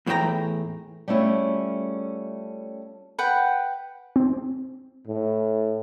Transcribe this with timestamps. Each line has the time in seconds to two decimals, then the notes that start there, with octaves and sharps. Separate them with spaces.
0.06 E2 A2 E3 D4 G5 A#5
1.08 G3 A3 C#4 E4 F4 G#4
3.18 B4 F#5 G5
4.16 C4
5.08 A2